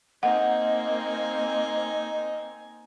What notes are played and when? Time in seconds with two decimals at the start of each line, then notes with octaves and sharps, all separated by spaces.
0.23 A#3 C4 D#4 D#5 F#5 G#5